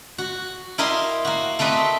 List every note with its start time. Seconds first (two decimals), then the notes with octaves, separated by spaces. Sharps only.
0.18 F#4
0.78 E4 G4 A#4 C5 D#5 F5
1.25 A#3 F#4
1.59 A3 C4 G4 B4 D#5